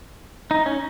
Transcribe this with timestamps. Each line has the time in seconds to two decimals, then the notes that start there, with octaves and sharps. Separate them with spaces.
0.51 D#4
0.66 C#4